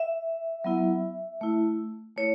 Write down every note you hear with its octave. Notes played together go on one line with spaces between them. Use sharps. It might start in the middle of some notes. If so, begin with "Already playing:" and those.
Already playing: E5
F#3 B3 E4
A3 E4
A3 E4 C#5